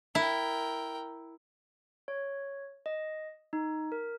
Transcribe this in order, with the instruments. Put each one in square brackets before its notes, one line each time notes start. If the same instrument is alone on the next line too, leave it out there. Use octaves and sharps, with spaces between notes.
[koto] E4 [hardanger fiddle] A#4 G5
[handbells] C#5
D#5
D#4
A#4